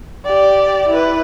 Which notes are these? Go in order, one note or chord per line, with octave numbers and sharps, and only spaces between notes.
G4 D5
E4 B4